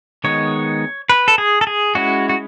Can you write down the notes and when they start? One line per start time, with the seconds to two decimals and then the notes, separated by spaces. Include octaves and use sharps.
0.24 D#3 G#3 B3 D#4 C#5
1.10 B4
1.28 A4
1.38 G#4
1.61 A4
1.67 G#4
1.95 G#3 C#4 E4 F#4
2.29 F#4